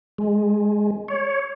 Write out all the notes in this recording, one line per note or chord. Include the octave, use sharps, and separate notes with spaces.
G#3
C#5